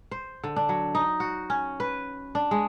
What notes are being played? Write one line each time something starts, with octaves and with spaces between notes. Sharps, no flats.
C5
D3
D4
F#3
D#4
F#4
C#4
B4
D4
G#3